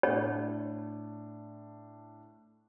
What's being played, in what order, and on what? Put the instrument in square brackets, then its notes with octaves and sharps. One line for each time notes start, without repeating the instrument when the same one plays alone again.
[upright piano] A2 D4 [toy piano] C#5